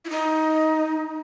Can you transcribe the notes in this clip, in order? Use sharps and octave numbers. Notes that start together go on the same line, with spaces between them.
E4
D#4